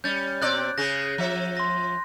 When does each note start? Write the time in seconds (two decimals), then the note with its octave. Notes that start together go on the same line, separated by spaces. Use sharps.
0.04 G3 C#4 G6 A6
0.42 B2 C4 D5 F#6
0.78 C#3 C#4 G#4 A#6 D#7
1.18 F3 E5
1.57 C6 A#6